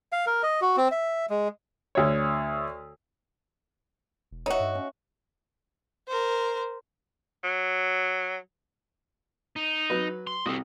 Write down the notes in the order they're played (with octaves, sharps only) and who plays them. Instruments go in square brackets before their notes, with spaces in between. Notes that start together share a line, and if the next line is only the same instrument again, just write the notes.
[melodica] F5
A#4
D#5
F#4
C4
E5
G#3
[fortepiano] D2 C#5
[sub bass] E1
[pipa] D#4 F#4 [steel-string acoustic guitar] C#5 D5 E5
[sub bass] G2
[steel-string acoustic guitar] C#4
[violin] A#4 C5
[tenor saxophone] F#3
[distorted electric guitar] D#4
[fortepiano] F#3 B4
[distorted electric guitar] C6
[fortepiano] C2 D#6 [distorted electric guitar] F#4 A4